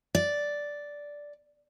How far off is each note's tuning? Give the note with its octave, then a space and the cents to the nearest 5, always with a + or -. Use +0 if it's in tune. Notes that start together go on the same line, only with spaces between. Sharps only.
D5 -5